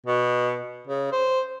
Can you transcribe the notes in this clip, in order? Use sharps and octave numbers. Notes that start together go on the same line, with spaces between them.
B2
C#3
C5